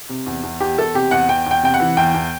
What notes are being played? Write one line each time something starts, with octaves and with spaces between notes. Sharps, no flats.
C3
E2
E2
E2 G4
E2 A4
C3 G4
E2 F#5
E2 G5
E2 G5
C3 G5
F#5
E3
E2 G5
E2